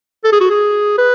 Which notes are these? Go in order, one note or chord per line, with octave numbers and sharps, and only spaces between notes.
A4
G#4
F#4
G#4
B4